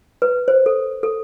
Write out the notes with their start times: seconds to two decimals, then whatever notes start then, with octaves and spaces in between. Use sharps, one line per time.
0.22 B4
0.48 C5
0.66 A4
1.03 A4